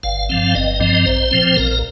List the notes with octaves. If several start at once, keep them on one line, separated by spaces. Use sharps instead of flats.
G1 F5
G2 F3 C4 F5
G1 D#5
G2 F3 C4
A#1 C5
A#2 F3 C4
A#1 A#4